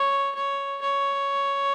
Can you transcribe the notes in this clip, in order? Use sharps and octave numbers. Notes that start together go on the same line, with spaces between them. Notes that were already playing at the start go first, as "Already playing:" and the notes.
Already playing: C#5
C#5
C#5